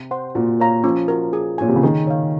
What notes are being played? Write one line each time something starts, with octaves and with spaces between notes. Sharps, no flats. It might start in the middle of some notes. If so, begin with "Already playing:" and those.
Already playing: C3
C5 F#5 C6
A#2 F#4
A#4 C#5 F5 A#5
F3 C#4
F#4 A#4
G#4
A#2 C#5 G#5
C3
C#3
D#3 G#4
C#5 F5